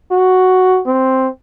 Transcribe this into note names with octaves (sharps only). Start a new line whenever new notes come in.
F#4
C4